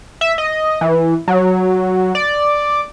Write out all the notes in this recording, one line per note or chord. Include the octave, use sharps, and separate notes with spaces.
E5
D#5
E3
F#3
D5